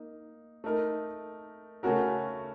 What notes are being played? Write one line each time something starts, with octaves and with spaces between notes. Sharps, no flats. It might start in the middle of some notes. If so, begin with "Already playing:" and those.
Already playing: A#3 D#4
A3 D#4 A#4
C#3 A3 C#4 F#4 A#4